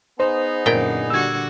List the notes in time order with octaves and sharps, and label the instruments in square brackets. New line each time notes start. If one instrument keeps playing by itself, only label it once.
[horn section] B3 D#4 G#4 [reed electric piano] C5
[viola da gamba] F#2 D3 [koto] A#2 G5
[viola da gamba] D3 G3 F#4 [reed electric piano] E6 G#6